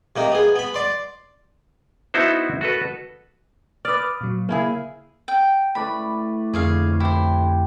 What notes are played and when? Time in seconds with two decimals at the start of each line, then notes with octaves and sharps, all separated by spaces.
0.16 C3 A#3 D#4
0.32 B3 G#4
0.56 B3 B5
0.74 D5 C6
2.14 B3 D#4 E4 F#4 C5
2.61 F#4 A4 B4
3.85 B4 D5 D6 D#6 F6
4.21 A#2 F#3
4.49 C#3 A#3 E4 G#4
5.28 G5
5.75 A2 B4 D5 B5
6.53 F2 D3 G#4 C#5 F5
7.00 E4 G4 C5